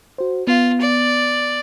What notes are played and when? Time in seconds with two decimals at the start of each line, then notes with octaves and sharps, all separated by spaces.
0.18 F#4 C5
0.47 B3 F4
0.81 D5